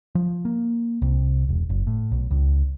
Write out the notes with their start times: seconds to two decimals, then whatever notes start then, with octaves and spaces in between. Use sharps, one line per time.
0.15 F3
0.45 A#3
1.02 C2
1.49 E1
1.70 F#1
1.87 A2
2.12 B1
2.31 C#2